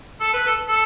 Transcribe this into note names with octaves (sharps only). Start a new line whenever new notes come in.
A4
B4
A4
A4